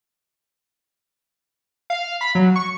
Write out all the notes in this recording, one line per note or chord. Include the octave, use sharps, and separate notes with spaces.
F5
B5
F#3
C#6